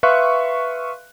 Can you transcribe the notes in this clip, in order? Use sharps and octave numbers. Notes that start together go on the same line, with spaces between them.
B4 E5 F5 C6 C#6 F#6